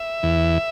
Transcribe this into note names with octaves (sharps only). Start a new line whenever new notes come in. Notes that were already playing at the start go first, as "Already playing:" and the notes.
Already playing: E5
E2